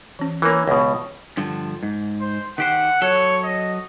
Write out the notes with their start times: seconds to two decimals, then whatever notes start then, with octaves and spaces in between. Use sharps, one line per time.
0.19 E3 C#4
0.42 E3 A#3 A#4 C#5
0.68 C#2 B2
1.37 G2 D3 F3
1.83 G#2
2.20 C5
2.58 D#3 G4 C5 F#5
3.02 F#3 A4 C#5
3.44 D#5